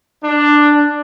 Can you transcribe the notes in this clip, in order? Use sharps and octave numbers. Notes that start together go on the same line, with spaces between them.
D4